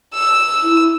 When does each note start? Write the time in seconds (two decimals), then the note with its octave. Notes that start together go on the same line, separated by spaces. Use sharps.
0.14 E6
0.63 E4